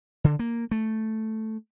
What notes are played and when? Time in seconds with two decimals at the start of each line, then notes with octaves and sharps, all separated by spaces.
0.24 D3
0.39 A#3
0.71 A3